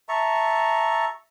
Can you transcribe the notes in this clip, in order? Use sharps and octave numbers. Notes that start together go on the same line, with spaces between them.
E5 A5 A#5 C#6